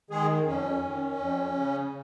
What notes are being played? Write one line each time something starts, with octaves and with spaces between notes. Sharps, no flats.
D#3 G#3 G#4
F2 C#4
D#3
F2
C#3